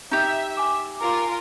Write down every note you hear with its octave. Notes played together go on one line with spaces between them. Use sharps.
D#4 G4 E5
G#5 D6
F4 A#4